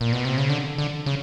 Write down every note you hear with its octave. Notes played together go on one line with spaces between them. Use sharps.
A#2
B2
C3
C#3
D3
D3
C#3